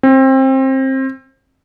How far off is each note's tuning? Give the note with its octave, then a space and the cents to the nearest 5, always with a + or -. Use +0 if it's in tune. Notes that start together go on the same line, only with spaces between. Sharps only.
C4 +25